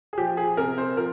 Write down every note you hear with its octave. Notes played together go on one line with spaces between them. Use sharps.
G#4
F3 G4
G#4
C3 A#4
C5
F3 A#4